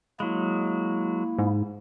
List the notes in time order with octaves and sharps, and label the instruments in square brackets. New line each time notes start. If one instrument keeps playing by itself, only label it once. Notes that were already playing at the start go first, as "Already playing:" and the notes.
[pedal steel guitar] F#3 G#3 [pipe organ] A#3 E4
[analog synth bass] G#2